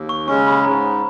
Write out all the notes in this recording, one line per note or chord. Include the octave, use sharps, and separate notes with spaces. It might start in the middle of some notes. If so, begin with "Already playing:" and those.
Already playing: D#2
C#6
C#3 G#3 C#4 C#6
B5
G#2 A#5